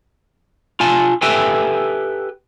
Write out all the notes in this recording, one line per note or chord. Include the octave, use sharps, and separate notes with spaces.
F4 G#5 A5
G4 A4 B4 E5 G5 G#5